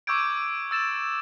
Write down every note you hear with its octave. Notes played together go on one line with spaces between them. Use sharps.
C#6 D6 E6 G6 G#6 D7
E6 A6 E7